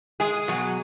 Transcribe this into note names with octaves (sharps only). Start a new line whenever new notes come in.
G#3 G#4
B2 F#3